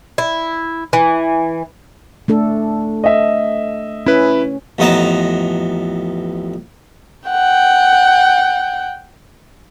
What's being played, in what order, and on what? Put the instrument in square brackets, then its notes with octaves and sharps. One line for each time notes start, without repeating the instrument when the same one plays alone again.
[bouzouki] E4
E3
[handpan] A3 D4 A4
[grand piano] D#5 E5
[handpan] C#4 [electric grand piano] E4 B4
[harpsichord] A1 F2 B3 D#5 A5 A#5
[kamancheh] F#5 G5